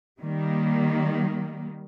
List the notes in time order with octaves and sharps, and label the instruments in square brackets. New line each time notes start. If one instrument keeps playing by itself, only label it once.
[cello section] D#3 G3 A#3